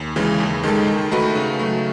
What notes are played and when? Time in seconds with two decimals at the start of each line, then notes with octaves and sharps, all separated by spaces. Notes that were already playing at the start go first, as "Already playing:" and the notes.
Already playing: D#2
0.16 C#3 E3 G#3
0.40 D#2
0.63 D#3 G#3 D#4 A4
0.88 D#3
1.11 A3 D#4 F#4 B4
1.35 C#3
1.59 F#3 A3